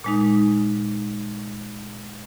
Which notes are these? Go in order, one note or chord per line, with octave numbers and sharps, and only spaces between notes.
A#2 G#3 D#4